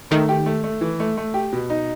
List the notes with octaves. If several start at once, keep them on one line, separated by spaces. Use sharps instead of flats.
D#3 A3
G4
A3
A3
E3
A3
A3
G4
B2
D#4